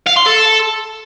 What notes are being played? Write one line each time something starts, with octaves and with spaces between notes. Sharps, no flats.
F5
C6
A4